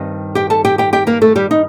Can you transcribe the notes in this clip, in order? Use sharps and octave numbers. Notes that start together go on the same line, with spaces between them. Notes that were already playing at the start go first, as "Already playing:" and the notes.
Already playing: G2 D#3 G3 C4
G4 G5
A4 A5
G4 G5
G4 G5
G4 G5
A#3 A#4
A3 A4
G3 G4
D#4